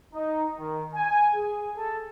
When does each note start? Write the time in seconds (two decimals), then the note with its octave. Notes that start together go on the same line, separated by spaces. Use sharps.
0.14 D#4
0.58 D#3
0.94 G#5
1.35 G#4
1.76 A4